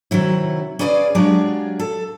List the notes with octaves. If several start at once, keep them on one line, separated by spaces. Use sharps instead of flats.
C3 D#3 F#3 E4
C#4 G#4 B4 D5 D#5 F5
F#3 G#3 D4 F4 G4 G#4
A4